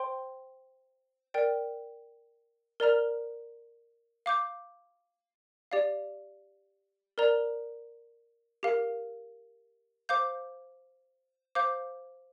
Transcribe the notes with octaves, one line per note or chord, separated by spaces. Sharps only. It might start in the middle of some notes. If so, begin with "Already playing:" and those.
Already playing: C5 G5 C6
A#4 D5 G5
A#4 D5 A#5 F6
F5 D6 G6
G4 D5 F5
A#4 D5 A#5
G4 A#4 F5
C5 F5 D6 G6
C5 F5 D6 G6